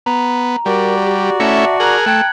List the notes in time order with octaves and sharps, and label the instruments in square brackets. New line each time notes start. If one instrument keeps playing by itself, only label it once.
[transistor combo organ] B3 [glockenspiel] A#5
[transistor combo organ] G3 [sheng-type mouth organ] F#4 D5 [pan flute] A#4
[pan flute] G4
[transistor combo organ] A3 C#4 E4 [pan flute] E5 [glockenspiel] A5 A#6 C#7
[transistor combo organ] G#4 A#4 [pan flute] A#5 [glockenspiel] F#6 G#6 F#7
[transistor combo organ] A3 [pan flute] G5 [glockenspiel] F#6 G#6